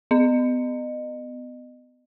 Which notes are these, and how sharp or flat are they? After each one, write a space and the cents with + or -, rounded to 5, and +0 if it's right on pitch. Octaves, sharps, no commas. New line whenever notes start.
B3 +30 D#5 -30